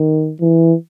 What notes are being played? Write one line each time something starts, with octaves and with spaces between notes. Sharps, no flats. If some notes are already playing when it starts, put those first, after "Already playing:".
Already playing: D#3
E3